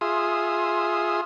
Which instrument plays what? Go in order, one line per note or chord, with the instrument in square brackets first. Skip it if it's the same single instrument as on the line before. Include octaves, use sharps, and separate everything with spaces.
[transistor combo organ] F4 G#4 E5 C6 D#6